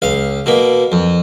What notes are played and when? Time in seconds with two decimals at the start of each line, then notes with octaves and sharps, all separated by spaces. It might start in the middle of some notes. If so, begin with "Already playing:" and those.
0.02 C#2 F5
0.46 B2 A#3
0.92 F2